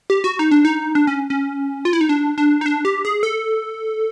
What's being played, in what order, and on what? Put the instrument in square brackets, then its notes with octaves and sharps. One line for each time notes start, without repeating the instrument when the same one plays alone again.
[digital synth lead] G4
F#4
D#4
D4
D#4
D4
C#4
C#4
F4
E4
D#4
D4
D4
D#4
D4
G4
G#4
A4